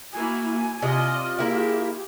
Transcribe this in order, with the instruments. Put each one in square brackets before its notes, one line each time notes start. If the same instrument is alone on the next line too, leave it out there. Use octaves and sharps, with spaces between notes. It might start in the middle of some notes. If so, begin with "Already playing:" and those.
[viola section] A#3 E4 F#4 [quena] G#5
[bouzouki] C3 [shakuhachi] F4 [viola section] D5 D#5
[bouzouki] A#3 E4 [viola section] G4 G#4 [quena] E5